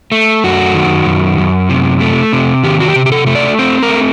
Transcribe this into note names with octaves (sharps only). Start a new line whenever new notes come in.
A3
F#2 F#4
D#3
F#2
F#2
C3
A3
C3
D#3 G4
F#4
G4
C3
G4
A4
A3
D5
C4 C5
A#4
A3